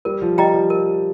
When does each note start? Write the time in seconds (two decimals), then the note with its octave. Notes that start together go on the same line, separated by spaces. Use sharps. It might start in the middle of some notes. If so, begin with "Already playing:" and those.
0.05 G3 A#4
0.22 F3
0.38 G3 D#5 G5 A#5
0.54 F3
0.70 A#4